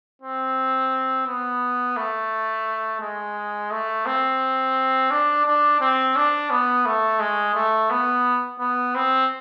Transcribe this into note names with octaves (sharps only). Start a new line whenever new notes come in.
C4
B3
A3
G#3
A3
C4
D4
D4
C4
D4
B3
A3
G#3
A3
B3
B3
C4